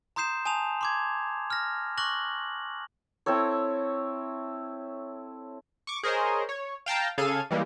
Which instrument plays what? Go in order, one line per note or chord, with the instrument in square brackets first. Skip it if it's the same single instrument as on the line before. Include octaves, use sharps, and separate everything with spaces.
[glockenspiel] A#5 C6 D#6 G6 C7 E7
G#5 A5 D#6 F7
C6 D6 G#6
F6 A#6
C#6 D6 F#6 A#6 F#7
[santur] C4 E4 A4 C#5
[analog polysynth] C#6 D6
G#4 A#4 C5 C#5 D#5
C#5
F5 G5 A5 A#5
C#3 G#4 A4 F5 G#6 D#7
E3 G3 G#3 A#3